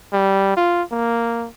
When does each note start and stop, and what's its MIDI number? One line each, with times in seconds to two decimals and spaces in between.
0.13 0.54 55
0.57 0.82 65
0.92 1.47 58